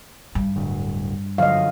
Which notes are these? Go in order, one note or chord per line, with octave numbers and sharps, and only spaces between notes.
G2
D1 D2
D3 F3 F#3 D#5 F5